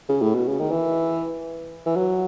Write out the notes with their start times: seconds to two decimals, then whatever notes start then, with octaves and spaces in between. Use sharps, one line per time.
0.09 C#3
0.22 A2
0.35 B2
0.47 C#3
0.60 D#3
0.71 E3
1.86 E3
1.96 F#3